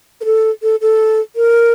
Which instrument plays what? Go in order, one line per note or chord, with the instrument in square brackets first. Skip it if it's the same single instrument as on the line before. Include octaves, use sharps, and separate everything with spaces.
[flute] A#4
A4
A4
A4
A#4